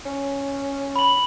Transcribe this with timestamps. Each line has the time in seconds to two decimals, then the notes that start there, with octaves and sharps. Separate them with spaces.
0.06 C#4
0.96 B5 F#7